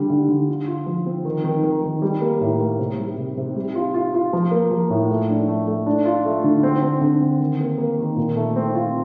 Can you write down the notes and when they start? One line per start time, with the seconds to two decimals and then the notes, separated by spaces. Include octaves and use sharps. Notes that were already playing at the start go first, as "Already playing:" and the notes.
Already playing: D3 G3
0.10 D3
0.29 D3
0.48 F4
0.68 F4
0.86 F3
1.06 C4
1.25 D#3
1.44 D#3
1.64 D#3
1.83 D#3
2.02 G3
2.21 A#3
2.41 A2
2.60 A#3
2.79 C3
2.99 G3
3.17 C3
3.37 C3
3.56 G3
3.75 F4
3.94 F4
4.14 F4
4.33 F3
4.51 A#3
4.71 F3
4.90 A2
5.10 A3
5.29 D4
5.48 A3
5.67 A3
5.86 D4
6.05 F4
6.25 A3
6.44 D3
6.63 C4
6.82 C4
7.01 D3
7.21 C4
7.40 D#3
7.60 A#3
7.78 A#3
7.99 D#3
8.17 A#2
8.36 A3
8.56 C4
8.75 F4